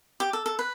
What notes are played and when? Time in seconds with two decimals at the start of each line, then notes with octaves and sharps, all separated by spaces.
0.20 G4
0.33 A4
0.46 A4
0.59 B4